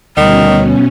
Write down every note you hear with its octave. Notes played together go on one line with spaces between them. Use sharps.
D2 B2 D#3 G3 C#4